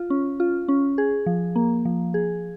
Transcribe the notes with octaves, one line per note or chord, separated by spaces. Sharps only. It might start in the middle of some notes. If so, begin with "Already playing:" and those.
Already playing: F4
C#4
F4
C#4
G#4
F3
A#3
F3
G#4